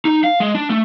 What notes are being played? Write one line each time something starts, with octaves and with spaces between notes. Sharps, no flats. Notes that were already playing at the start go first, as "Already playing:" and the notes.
D#4
F5
G#3
D4
A3